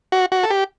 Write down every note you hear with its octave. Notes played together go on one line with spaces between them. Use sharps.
F#4
F#4
A4
G4